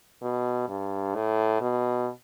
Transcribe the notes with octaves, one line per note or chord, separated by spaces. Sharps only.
B2
G2
A2
B2